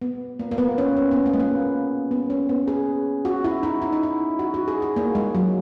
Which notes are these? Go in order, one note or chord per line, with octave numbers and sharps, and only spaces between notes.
B3
A#3
A#3
B3
C#4
C#4
B3
A#3
G#3
A#3
B3
C#4
B3
G#4
F#4
E4
D#4
E4
D#4
E4
F#4
F#4
G#4
G#4
A#3
G#3
F#3